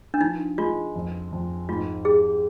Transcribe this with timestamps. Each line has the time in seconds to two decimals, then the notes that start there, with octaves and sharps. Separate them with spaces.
0.14 D4
0.21 F3 D#4
0.58 G#3 F4
0.96 F2
1.32 F2
1.69 G#2 F4
2.05 G4 G#4